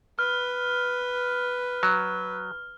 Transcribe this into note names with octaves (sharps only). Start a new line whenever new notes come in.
B4 F6
F#3